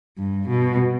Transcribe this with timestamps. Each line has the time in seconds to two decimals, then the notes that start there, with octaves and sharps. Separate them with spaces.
0.18 G2
0.48 B2